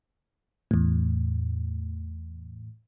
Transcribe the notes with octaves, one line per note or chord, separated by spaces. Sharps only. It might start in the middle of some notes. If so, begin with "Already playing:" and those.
E2 A2